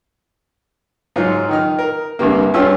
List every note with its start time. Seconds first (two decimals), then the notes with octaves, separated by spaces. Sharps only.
1.16 G#2 F#3 F4
1.49 D#3 D#4 F6
1.79 A#4
2.19 C2 G2 C3 A#3
2.54 G2 C#4 F4 G4 G#4 E6